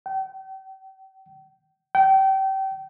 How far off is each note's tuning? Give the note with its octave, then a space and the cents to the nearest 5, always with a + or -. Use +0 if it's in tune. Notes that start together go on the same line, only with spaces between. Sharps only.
G5 -40
G5 -30